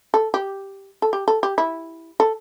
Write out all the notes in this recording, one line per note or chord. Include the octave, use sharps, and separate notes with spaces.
A4
G4
A4
G4
A4
G4
E4
A4